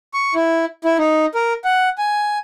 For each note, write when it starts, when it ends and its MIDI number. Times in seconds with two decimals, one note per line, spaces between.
0.14 0.34 85
0.35 0.65 64
0.85 0.98 64
0.98 1.26 63
1.35 1.53 70
1.64 1.89 78
1.98 2.38 80